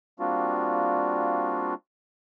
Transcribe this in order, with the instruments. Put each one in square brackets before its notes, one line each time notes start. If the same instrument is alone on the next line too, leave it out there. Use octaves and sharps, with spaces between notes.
[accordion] G3 A#3 C4 D4 F4 F#4